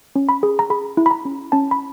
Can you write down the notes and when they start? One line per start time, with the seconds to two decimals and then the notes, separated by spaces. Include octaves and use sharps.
0.15 C#4
0.29 B5
0.43 G#4
0.59 A#5
0.70 G#4 B5
0.97 E4
1.06 B5
1.11 A#5
1.25 C#4
1.52 C#4 A5
1.71 B5